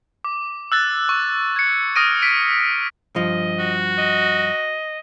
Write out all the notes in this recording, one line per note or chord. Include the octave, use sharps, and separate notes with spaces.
D6
E6 F#6 A6
C#6
G#6 C#7
D#6 F6 A#6 D7 D#7
B6 D7
G2 F3 D#5
F#4
D#5